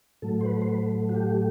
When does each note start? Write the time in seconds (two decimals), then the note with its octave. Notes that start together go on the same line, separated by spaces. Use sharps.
0.22 A2 F#3 A3 A4
0.41 C5
0.45 B4
0.62 C5
0.69 B4
1.09 F#4
1.15 G4